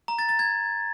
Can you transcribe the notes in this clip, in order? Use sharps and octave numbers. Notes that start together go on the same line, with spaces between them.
A#5
A6
A6
G#6